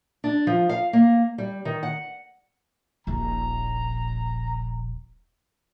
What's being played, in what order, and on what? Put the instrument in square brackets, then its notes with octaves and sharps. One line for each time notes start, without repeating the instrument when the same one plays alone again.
[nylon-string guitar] D4
F3
F5
A#3
G3
D#3
F#5
[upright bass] D#1 A#1 [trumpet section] A#5